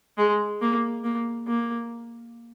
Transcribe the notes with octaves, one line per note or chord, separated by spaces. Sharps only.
G#3
A#3
A#3
A#3